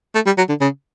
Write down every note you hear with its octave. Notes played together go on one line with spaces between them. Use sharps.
A3
G3
F#3
D3
C#3